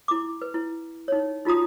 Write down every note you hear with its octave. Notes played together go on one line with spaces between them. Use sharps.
E4 D6
B4
E4
D#4 C#5
D#4 F4 F#4 A#5 D#6